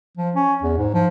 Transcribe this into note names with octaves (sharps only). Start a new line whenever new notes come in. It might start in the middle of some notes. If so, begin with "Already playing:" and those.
F3
C#4
E2
G#2
F3